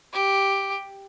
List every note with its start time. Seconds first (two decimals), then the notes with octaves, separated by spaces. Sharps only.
0.13 G4